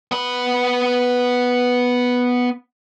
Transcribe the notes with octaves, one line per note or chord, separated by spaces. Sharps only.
B3 B5